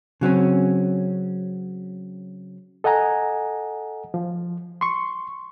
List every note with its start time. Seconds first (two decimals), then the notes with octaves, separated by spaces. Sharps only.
0.21 C#3 F#3 C4 C#4
2.84 A4 D#5 F#5 G#5 A#5
4.14 F3
4.81 C6 C#6